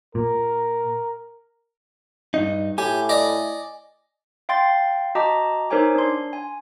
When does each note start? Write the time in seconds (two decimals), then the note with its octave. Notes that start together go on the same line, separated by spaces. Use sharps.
0.15 A#2 A#4
2.34 G2 D#4
2.78 A2 G4 G#5
3.09 D5 D#5
4.49 F5 G5 C6 A6
5.15 F#4 D#5 A5 A#5 D6
5.70 D#4 A#4 C5 C#5 G#5 D6
5.95 D4 C6
6.33 G#5